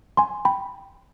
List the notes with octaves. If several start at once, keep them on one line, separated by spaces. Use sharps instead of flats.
G#5 C6
G5 B5